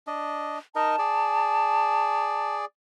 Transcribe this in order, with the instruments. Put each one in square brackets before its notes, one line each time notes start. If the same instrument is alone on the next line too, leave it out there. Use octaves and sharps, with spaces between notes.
[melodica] D4 D#5
[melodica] D#4 A#4 D#5 [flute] A5
[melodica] G#4 D5